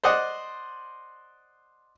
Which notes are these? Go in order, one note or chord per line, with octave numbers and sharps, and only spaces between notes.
C5 D5 D#5 F#5